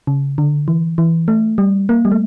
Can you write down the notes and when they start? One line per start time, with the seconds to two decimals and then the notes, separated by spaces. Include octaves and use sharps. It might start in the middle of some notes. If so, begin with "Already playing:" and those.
0.07 C#3
0.38 D3
0.68 E3
0.98 E3
1.28 A3
1.58 G3
1.89 A#3
2.05 G3
2.12 A3